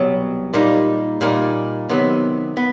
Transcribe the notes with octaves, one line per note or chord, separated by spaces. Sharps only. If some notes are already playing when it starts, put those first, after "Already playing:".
Already playing: C2 B2 F#3
A#2 G3 A#3 D#4
A#2 G3 A#3 D#4
C3 D#3 F#3 B3
B3